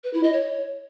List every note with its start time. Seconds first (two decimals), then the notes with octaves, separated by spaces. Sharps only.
0.04 B4
0.13 E4
0.23 D#5
0.33 C#5